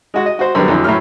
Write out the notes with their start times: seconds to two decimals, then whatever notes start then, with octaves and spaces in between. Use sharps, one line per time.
0.14 G#3 F#4
0.26 D#5
0.39 F#4 C5
0.55 F#2 D3 G3 B3
0.68 F2 D3 E3 F#3
0.84 A2 F#3 A3 F6